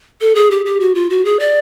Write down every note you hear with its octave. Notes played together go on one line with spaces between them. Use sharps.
A4
G#4
G4
G4
F#4
F4
F#4
G#4
D5